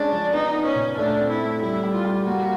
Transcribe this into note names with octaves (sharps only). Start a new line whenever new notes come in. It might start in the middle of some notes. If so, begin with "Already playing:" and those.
Already playing: G#3 C#4 D4
F3
B3 D#4
B3
C#4
A#2
A3 D4
C4
E4
A3
G3 E4
G3
F4
G3
A#3 F#4